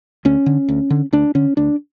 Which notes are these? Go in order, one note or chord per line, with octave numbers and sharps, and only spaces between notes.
D2 C#4
D3
D2
D3
D2 D4
D3 C#4
D2 D4